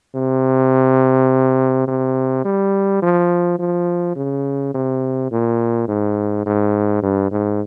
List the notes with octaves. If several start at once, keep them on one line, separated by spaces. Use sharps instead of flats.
C3
C3
G3
F3
F3
C#3
C3
A#2
G#2
G#2
G2
G#2